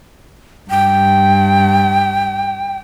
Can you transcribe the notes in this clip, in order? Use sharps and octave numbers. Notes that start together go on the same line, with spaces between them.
G2 G5